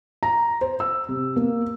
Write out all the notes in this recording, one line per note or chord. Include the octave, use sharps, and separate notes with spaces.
A#5
C5
E6
C3
A#3